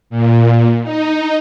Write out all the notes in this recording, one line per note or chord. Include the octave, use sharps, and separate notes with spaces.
A#2
D#4